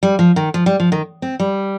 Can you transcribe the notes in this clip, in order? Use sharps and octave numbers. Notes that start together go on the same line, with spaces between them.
G3
F3
D#3
F3
G3
F3
D#3
C4
G3